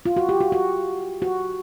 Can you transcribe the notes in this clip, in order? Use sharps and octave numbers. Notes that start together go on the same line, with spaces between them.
F4
F#4
G4
F#4
F#4
F#4